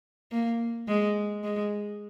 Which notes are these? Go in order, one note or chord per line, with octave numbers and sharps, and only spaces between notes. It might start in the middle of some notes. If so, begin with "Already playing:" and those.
A#3
G#3
G#3